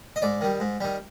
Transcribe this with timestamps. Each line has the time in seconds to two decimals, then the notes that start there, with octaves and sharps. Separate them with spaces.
0.16 D#5
0.22 G#2 D5
0.41 D#3 G3
0.60 G#2
0.81 D#3 G3